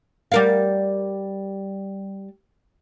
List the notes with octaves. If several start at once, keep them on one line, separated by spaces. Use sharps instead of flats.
G3 A#4 F5